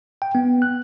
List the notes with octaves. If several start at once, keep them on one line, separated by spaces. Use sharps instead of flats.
G5
B3
F#6